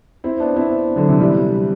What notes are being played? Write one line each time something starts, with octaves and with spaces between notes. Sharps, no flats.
C4 E4
B3 D4
C4 E4
D3 F#3
C3 E3
E3 G3